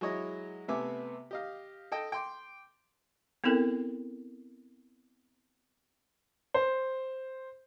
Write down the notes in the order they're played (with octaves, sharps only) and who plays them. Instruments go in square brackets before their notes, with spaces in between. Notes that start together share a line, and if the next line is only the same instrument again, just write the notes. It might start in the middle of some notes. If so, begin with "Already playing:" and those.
[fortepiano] F#3 G#3 E4 C#5 D#5
C3 A3 B3 E5 G#5 D6
G4 D#5 F5
A4 D#5 G5
G5 C6 D6
[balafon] B3 C4 E4 A4 A#4
[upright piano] C5